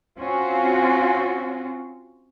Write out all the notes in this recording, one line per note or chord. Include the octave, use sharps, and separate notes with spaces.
C4 C#4 F4 F#4